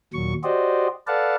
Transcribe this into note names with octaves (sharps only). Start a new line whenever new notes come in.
D#2 A#2 F#3 C#6
F#4 G4 C5 D5 D#5
A4 B4 D5 F5 F#5 A5